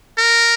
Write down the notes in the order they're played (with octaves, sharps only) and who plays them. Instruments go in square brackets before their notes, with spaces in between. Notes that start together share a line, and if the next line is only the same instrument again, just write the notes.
[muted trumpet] A#4